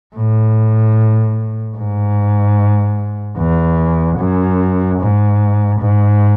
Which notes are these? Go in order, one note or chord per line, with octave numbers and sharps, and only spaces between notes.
A2
G#2
E2
F#2
G#2
G#2